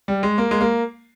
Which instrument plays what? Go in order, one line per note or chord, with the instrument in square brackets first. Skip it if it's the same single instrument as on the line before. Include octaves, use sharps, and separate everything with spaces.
[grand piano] G3
G#3
A#3
G#3
A#3